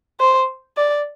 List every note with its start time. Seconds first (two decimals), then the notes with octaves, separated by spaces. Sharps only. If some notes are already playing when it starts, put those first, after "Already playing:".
0.20 C5
0.77 D5